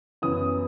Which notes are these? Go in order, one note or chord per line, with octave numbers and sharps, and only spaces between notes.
F#2 E3 B3 E4 D#6